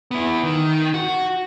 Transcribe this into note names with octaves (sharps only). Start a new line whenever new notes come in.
B3 E4
D#3
F#4